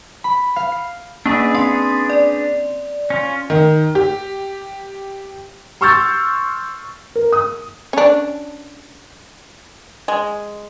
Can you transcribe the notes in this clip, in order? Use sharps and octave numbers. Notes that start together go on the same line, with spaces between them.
B5
F5
C7
A#3 C#4 D4 G#4 B4
C4 C6
D5
C#4 F4
D#3
G4
C6 C#6 E6 F6 G6 A6
A#4
D#6
C#4 D4
G#3